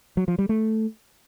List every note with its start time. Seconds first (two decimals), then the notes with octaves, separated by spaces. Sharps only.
0.17 F#3
0.28 F3
0.39 G3
0.49 A3